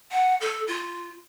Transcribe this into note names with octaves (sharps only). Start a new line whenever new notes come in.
F#5
A4
F4